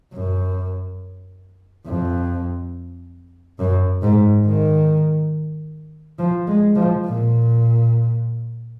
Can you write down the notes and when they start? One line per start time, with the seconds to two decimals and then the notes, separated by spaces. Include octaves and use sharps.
0.14 F#2
1.87 F2
3.59 F#2
4.02 G#2
4.45 D#3
6.19 F3
6.48 G#3
6.76 F3
7.05 A#2